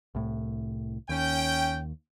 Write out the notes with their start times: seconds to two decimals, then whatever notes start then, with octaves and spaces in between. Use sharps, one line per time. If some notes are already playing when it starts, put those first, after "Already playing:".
0.15 C2 A2
1.09 D#2 C#4 G5